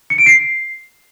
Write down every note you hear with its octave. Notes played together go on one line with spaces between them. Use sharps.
C#7
D7
C7